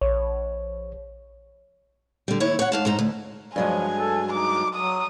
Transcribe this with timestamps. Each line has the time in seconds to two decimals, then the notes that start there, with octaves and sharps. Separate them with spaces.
0.01 A#1 C#5
2.28 D3 G3
2.40 D#2 E4 C#5
2.59 C#5 F#5
2.72 G#2 F5 A5
2.85 G#2 D#4 C5 A#5
2.99 D2
3.56 G2 F3 F#3 G#3 G#5
3.97 A4
4.33 D#4 D6
4.75 F#3 D#6